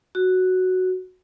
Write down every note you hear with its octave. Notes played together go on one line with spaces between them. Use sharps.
F#4